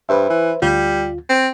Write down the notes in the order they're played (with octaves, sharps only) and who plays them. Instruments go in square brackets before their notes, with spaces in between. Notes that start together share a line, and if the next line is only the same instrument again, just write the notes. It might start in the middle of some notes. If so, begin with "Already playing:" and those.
[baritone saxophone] G2 [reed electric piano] B4 C5 E5
[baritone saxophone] E3
[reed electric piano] D2 F4 [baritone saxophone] G3
[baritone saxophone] C4